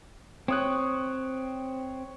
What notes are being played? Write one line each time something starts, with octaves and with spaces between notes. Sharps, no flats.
C4 C#5 D#6 F#6